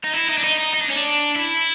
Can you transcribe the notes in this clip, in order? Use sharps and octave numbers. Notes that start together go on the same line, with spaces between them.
D#4
E4
D#4
D4
D#4
D#4
D#4
D4
C#4
D4
E4